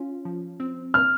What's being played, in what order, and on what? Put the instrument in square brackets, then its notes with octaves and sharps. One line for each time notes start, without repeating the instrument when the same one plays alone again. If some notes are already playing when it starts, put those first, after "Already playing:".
Already playing: [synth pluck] C#4 F4
F3
C4
[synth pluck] C4 [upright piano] F6